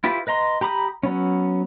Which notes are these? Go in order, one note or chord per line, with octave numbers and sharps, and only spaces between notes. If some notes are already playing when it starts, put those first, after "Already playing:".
E4 F4 G4 B4
B4 D#5 A#5 C6
G4 A#5 B5 D6 D#6
F#3 B3 C#4